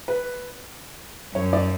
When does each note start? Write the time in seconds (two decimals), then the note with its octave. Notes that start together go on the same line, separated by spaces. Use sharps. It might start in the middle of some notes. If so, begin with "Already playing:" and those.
0.08 B4
1.34 F#2 C#5
1.53 D5